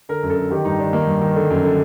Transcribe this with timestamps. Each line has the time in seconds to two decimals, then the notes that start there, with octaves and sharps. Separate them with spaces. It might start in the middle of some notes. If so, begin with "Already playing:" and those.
0.09 D3 A#4
0.23 F#2
0.30 A4
0.37 D3
0.51 D#3 G4
0.65 G2 D#4
0.80 D#3 D4
0.93 D#3 A#3
1.07 G2
1.21 D#3
1.36 D3
1.50 F#2
1.65 D3